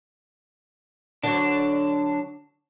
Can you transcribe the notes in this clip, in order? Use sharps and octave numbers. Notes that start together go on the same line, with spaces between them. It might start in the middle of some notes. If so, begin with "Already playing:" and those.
D3 F#3 D4